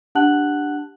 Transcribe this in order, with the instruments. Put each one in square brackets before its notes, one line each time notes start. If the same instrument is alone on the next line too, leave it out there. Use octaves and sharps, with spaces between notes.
[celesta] D4 G4 F#5 A5 F#6 F#7